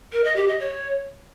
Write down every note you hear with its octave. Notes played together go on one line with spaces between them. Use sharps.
A#4
D#5
G4
D#5
C#5